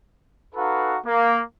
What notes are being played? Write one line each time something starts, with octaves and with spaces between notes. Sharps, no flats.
D#4 F#4 A4 B4 F5 A#5
A#3